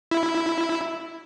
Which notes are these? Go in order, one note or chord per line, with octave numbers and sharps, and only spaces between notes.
E4